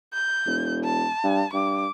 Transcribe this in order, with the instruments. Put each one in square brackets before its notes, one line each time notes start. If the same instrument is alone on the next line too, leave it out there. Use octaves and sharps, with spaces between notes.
[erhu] G6
[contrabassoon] E1
[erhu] A5
[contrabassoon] G2
[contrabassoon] G2 [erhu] D6